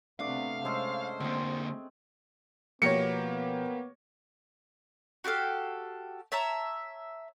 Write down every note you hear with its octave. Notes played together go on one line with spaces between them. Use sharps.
C3 A3 B3 D4 F5 F#5
G#3 C#4 A4 C5
D3 A#3 C4 G#4
B2 F3 A#3 B3 G4 C#5 A#6 C#7
F#4 G4 A4 F5
C#5 E5 A5 A#5